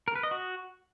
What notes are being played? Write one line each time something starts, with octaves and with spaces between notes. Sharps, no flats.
A#4
B4
D#5
F#4